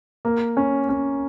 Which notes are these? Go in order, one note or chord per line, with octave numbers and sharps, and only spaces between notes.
A#3
C#4
C#4